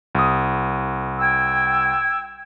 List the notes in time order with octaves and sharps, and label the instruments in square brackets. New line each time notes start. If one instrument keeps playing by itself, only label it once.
[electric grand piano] C2 D#6
[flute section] G5 E6 G#6